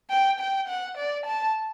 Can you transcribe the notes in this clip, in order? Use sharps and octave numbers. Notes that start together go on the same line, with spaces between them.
G5
G5
F#5
D5
A5